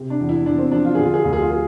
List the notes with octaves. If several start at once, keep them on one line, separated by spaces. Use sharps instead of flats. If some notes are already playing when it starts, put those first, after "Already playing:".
Already playing: C3
D4
E2
E4
E2 D4
C4
F3 D4
F4
D3 G#4
F4
G#4
D2 F4
G#4
F4
G#4